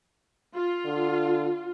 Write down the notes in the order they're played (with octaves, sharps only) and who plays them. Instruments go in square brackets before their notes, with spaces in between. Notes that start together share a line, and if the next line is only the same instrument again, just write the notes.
[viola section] F4
[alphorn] D3